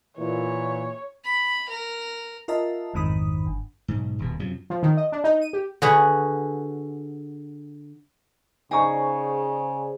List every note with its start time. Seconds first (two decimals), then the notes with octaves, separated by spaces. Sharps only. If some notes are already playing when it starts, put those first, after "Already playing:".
0.17 A#2 E3 C#5
1.24 B5
1.69 A#4
2.48 F4 A#4 D#5 E5 A5
2.94 A1 F2 G#2 D#3 B5 D#6
3.46 G1
3.88 B1 G#2
4.19 D#1 B2
4.40 F#2 C3 F3
4.70 F3
4.83 D#3
4.97 D#5
5.12 D4
5.24 D#4
5.42 D#7
5.53 G4
5.82 D3 F#4 G#4 B4
8.71 C#3 D#4 G#4 C5 D5 G#5 A#5 C#6